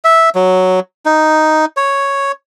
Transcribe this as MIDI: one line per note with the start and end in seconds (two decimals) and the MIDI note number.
0.05 0.29 76
0.35 0.80 54
1.06 1.65 63
1.77 2.32 73